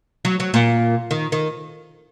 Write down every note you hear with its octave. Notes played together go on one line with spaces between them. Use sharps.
F#3
F#3
A#2
D#3
D#3